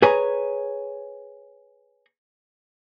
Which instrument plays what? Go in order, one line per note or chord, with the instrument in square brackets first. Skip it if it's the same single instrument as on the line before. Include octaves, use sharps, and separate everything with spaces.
[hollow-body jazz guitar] G#4 B4 C#5 G#5 A#5